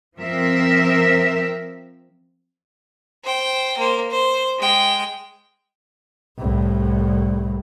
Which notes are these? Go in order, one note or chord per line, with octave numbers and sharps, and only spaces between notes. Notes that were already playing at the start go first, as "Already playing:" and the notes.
F3 C4 A#4 E5
C5 G5
A#3 C5
C5
G#3 G5
C2 A2